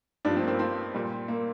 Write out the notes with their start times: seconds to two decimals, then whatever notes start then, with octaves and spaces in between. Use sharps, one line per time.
0.25 G2 F3 D4
0.36 C4
0.42 A#3
0.48 C4
0.59 C4
0.94 A#2 G3
1.28 A#3